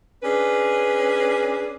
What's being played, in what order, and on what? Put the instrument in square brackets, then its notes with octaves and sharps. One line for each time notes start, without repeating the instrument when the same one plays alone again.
[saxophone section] C#4 D4 G#4 B4